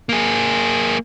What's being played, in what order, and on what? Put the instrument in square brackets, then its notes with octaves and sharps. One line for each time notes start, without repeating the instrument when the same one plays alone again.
[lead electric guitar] A#3 G#4